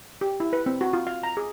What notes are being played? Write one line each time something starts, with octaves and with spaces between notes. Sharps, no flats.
G4
E4
B4
C4
F#4
F4
F5
A#5
G#4